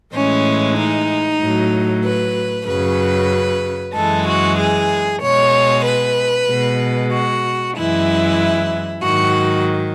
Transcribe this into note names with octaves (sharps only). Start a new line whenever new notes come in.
A2 E3 G#3 C#4
D#4
A2 F#3
B4
F#2 C#3 F#3 B4
F#2 E3 G#3 A4
F#4
G#4
B2 G#3 C#5
B4
B2 G#3
F#4
F#2 E3 G#3 E4
G#2 D#3 F#3 F#4